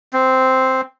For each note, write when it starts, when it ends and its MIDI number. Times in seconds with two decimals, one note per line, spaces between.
0.13 0.81 60